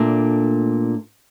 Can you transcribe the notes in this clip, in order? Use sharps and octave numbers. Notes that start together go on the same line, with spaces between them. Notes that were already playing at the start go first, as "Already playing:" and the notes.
Already playing: A#2 A3 D4